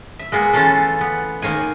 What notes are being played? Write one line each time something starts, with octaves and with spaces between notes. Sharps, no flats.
E5
G#3 A#3 B3
E3 A3 C#4 F4 A4
B3
D#3 A#3 C#5 G#5